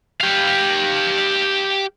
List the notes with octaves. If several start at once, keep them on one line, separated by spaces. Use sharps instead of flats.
G4 F5